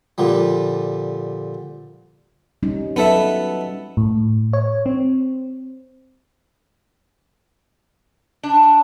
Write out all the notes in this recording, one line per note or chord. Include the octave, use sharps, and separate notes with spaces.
A#2 D3 F3 G3
G3 C#4 D#4
F#3 B3 D#4 A4 B4 E5
A2
C#5
C4
D4